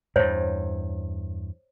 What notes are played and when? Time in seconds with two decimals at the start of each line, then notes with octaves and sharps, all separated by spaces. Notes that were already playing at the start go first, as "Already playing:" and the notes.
0.16 E2 G2 C5 C#5